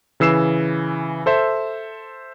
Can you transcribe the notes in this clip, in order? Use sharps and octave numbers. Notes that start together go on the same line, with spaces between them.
C#3 E3 E6 C7 E7
A4 C5 E5